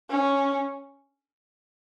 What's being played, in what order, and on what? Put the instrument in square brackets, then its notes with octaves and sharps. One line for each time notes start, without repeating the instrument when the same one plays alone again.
[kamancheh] C#4